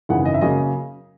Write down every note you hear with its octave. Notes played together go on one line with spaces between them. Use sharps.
G#1 F#2 C#3 E3 F#5
D#5
E5
C#3 F#3 A#3 D#5